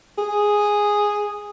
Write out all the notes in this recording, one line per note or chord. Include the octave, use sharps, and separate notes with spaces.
G#4